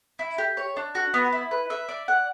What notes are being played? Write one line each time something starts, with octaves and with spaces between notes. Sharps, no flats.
E4
G4
C#5
D4
F#4
B3
E4
B4
E5
D5
F#5